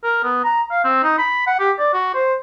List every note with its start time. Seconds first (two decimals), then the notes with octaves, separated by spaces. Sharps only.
0.04 A#4
0.24 B3
0.44 A#5
0.71 F5
0.84 C4
1.03 D#4
1.18 B5
1.47 F#5
1.59 G4
1.78 D5
1.94 F#4
2.14 C5